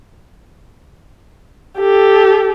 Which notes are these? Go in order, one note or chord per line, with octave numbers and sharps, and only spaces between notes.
G4 A4